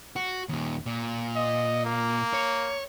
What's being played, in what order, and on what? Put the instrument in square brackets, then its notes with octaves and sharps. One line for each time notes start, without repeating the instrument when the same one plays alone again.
[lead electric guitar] F#4
D#2 A#2
A#2
[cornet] D#5
A#3
[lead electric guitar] C#5